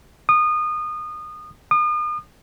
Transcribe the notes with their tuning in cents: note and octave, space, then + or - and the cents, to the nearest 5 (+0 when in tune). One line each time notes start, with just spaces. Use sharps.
D#6 -25
D#6 -40